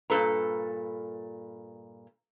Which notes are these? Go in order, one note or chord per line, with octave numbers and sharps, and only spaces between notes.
G2 A#2 A4 B4 A#5